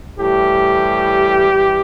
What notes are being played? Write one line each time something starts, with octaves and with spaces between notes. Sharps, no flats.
A2 E3 G3 G4
E3 G3